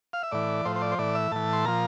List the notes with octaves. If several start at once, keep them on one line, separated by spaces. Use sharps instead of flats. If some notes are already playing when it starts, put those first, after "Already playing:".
F5
E5
A2 E3 D5
A2 F3 C5
C5
D5
C5
A2 E3 D5
E5
A2 E3 A5
C6
A#2 F3 A#5